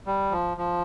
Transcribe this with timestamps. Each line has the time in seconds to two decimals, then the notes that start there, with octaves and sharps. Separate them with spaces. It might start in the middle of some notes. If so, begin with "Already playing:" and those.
0.06 G3
0.32 F3
0.57 F3